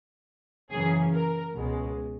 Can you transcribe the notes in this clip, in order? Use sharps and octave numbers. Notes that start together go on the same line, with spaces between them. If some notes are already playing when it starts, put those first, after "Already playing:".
F#2 C#3 E3 A#3 C#4 G#4
A#4
C#2 B2 G#3